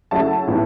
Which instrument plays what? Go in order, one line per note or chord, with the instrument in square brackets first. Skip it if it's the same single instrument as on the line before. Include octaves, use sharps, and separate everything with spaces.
[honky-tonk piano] C#3 F#3 A3 E4 A5
A2 E3 B3